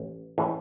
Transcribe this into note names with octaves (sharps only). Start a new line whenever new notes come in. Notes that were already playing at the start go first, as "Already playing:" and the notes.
Already playing: A1
A2 E3 G#3 C#4